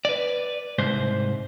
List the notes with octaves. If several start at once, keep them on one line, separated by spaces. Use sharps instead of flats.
B4 D5
C2 G#2 C5